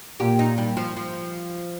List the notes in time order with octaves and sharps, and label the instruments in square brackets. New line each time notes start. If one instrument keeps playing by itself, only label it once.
[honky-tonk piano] A#2 [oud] G4
[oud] D#4
G3
F3
F3